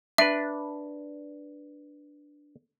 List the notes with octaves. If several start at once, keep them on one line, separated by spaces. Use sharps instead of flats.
D4 B4 E5